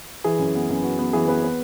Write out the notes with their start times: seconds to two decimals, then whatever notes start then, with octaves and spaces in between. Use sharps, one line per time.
0.24 E3 G#4
0.39 F#2
0.55 B3
0.69 F#2
0.83 B3 F#4
0.99 B3
1.13 E3 G#4
1.28 B3 B4
1.44 B4